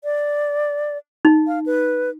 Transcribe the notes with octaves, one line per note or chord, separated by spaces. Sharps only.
D5
D#4
F5
B4